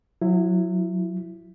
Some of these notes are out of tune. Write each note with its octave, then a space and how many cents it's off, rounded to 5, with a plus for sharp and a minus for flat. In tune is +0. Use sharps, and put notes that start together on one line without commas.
F#3 -20 E4 +10